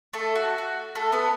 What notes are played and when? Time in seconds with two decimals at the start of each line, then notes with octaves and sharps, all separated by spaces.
0.13 A3 A4
0.35 F#4
0.58 F#4
0.95 A3 A4
1.12 B3 B4